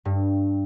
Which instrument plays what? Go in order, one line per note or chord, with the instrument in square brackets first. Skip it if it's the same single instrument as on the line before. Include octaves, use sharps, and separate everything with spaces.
[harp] G2